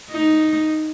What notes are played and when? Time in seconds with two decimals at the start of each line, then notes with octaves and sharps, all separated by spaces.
0.11 D#4